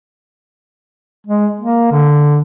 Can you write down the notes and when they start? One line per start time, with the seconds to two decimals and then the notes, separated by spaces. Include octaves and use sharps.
1.27 G#3
1.60 A#3
1.92 D3